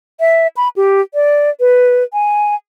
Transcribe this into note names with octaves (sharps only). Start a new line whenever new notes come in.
E5
B5
G4
D5
B4
G#5